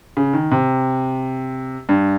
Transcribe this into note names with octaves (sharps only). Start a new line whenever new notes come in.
C#3
D#3
C3
G2